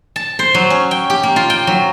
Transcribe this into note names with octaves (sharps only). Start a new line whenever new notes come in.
A5
C5
F#3
C#4
G5
G4
A#3
F4
G5
F#3